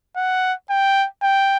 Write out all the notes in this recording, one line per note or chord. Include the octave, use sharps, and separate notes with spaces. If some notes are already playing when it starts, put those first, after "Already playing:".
F#5
G5
G5